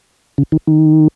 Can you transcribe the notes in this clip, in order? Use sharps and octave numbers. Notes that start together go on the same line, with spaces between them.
C#3
D#3
D#3